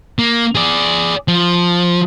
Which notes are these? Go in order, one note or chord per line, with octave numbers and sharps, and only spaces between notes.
A#3
G#4 D5
F3